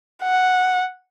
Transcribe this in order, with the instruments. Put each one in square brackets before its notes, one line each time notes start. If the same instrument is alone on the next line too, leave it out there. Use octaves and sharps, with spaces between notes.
[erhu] F#5